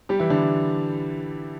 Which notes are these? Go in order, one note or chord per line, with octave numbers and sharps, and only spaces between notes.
G3 G4
E3 E4
D3 D4